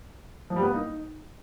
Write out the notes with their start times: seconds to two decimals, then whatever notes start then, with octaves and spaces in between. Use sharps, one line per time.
0.50 F3
0.56 G3
0.62 B3
0.68 A#3
0.74 D#4